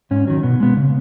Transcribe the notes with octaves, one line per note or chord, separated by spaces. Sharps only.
G#2 C#4
D#3 F#3
B2 B3
G#3 B3
C#3